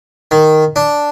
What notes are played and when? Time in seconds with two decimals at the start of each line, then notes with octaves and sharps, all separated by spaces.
0.31 D#3
0.76 D4